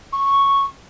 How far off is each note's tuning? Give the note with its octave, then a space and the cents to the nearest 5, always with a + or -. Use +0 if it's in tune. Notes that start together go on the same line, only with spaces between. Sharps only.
C#6 -5